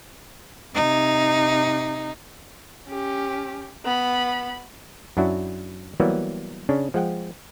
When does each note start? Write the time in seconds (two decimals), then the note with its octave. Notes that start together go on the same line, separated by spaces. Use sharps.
0.75 C3 D#4
2.88 C#4 G4
3.85 B3 B5
5.17 F#2 F#3 D4 E4 F#4
6.00 E3 F#3 G3 A#3 B3
6.69 C#3 C#4 D4
6.94 F3 G#3 F#5 G5